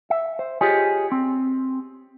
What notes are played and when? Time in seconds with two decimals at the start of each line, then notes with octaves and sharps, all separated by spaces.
0.10 E5
0.39 C5
0.61 F4 G4 G#4 C#5 D#5
1.12 C4